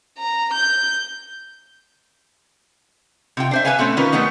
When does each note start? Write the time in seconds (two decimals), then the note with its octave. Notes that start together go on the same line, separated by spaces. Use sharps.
0.18 A#5
0.53 G6
3.37 C3 F4 G5
3.51 D4 C5 E5
3.65 B4 C#5 E5 F5 G#5
3.79 B2 A3 C4 C#4
3.97 D#3 C#4 F4 A#4 B4
4.12 G3 A3 B3 C#4 D#4